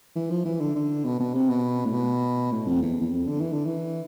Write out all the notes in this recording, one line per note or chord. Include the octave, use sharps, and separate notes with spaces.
E3
F3
E3
D3
D3
B2
B2
C3
B2
A2
B2
A2
F2
E2
E2
F2
D3
E3
D3
E3